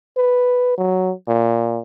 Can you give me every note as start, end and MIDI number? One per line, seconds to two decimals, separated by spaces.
0.17 0.75 71
0.78 1.12 54
1.28 1.80 46